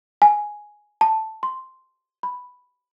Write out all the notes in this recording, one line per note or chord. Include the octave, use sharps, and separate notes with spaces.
G#5
A5
C6
B5